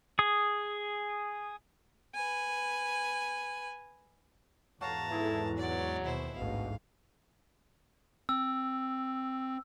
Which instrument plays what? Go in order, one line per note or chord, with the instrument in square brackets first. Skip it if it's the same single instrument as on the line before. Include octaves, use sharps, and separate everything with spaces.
[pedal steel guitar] G#4 D#6
[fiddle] B4 G#5
[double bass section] E2 G#2 [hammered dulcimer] F#4 C#5 F5 [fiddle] A5 A#5
[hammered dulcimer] E3 G#4 A4 [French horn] E4
[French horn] F#3 [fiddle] D5
[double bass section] D#2 B2 [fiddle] E4 C5
[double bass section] A1 D2 G#2 [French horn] B2 [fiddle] F5
[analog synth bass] C4 [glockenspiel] E6